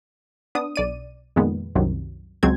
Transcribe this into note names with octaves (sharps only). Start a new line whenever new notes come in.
B3 D4 D#6
B1 D5 D#7
F2 A#2 D#3 G#3 B3
C2 F#2 C3 D#3 F#3
C#2 F#3 G#3 C4 G#6